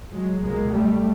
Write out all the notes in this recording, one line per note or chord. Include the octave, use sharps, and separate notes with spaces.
F#3 G#3
C#2 B2 G#3 A#3
G3 A3